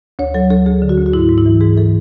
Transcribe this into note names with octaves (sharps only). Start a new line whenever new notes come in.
D2 C#5
F#3 A4
D2 A4
D2 G#4
D3
F#4
D2
F#4
G#2 E4
G#2
E4
E3
G#2 G#4
E3 A4